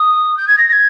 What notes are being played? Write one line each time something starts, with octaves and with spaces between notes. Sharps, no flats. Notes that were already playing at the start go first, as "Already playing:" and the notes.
Already playing: D#6
G6
G#6
A#6
A#6
G#6